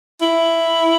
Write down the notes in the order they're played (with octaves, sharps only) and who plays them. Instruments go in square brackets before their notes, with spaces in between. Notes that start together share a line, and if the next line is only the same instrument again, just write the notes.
[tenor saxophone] E4